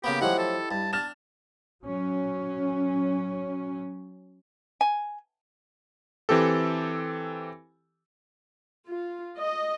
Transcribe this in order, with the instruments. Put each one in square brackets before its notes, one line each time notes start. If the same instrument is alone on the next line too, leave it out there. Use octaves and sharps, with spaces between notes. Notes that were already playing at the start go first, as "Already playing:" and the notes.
[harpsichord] C#3 A#3 B3 [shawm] G4
[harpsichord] F3 F#3 A3 [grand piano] E4 G4 D#5 [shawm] F#5
[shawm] A4
[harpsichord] G2 [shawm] A5
[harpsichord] D4 [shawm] A5 [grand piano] F6 A6 E7
[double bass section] F#3 C#4
[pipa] G#5
[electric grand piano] E3 C4 G4 A4
[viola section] F4
D#5